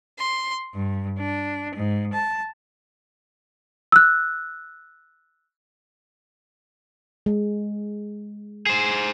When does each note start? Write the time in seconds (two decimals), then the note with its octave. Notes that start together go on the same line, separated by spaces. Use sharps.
0.20 C6
0.75 G2
1.19 D4
1.75 G#2
2.13 A5
3.92 E6 F#6
7.26 G#3
8.66 G#4 C5